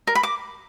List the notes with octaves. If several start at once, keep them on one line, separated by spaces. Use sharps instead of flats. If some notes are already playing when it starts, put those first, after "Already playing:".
A#4
B5
D6